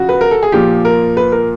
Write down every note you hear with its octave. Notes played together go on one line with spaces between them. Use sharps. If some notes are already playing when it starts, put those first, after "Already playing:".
Already playing: C#3 F3 F#4
B4
A#4
A4
G#4
A#2 F3 G4
A#4
B4
A#4